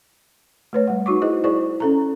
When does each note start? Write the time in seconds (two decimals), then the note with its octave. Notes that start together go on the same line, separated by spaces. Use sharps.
0.73 A3 B4 C#5
0.87 G3 F#5
1.06 D#4 F#4 C#6 D6
1.22 E4 G#4 C5 D#5
1.44 E4 G#4 C5 D5 C#6
1.80 C#4 A4 A#5